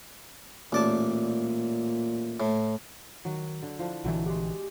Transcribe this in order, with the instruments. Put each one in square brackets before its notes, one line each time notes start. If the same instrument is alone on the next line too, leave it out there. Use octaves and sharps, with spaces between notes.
[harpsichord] A1 D5 A5 [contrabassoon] A#2
[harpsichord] A2
[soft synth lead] D#3 [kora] F#3 F#4
[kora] D3
[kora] F3 D4 [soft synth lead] E4
[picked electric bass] A#1 D3 E3 [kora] F#3 A3
[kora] G#3 F#4 [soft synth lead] G4